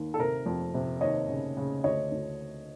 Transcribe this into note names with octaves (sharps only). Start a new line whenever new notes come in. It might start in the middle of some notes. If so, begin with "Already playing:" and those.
Already playing: D#2
A4
C3 A#4
F2
C3
D#2 C#5 D#5
C#3
C#3
D2 C#5 D#5
D2